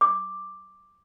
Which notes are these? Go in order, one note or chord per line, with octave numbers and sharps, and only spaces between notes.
D6